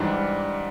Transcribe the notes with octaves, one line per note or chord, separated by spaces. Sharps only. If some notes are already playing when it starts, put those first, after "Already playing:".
Already playing: G#2 E3 G3 D4